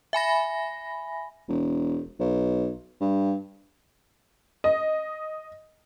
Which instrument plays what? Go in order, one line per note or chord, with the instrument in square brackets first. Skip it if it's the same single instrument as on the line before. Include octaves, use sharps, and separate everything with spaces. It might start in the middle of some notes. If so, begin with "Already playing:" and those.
[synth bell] E5 G#5 B5 A#6
[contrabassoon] E1
B1
G2
[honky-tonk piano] D#5